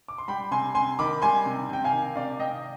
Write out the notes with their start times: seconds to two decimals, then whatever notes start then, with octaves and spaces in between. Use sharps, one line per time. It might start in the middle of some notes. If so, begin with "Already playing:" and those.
0.08 D6
0.18 C6
0.28 G3 G5 B5
0.51 C3 G#5 C6
0.75 C3 G#5 C6
0.99 D#3 B5 D6
1.22 G3 G#5 C6
1.46 C3
1.69 C3 G5
1.84 F5 G#5
1.92 D#3
2.16 C3 D5 F5
2.39 C3 D#5 G5